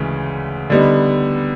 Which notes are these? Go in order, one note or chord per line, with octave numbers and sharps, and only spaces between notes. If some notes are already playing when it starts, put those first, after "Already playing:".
Already playing: D2 C#3 E3 G#3
D3 G3 B3 D#4